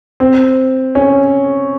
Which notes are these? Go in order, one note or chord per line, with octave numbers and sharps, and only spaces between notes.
C4
C#4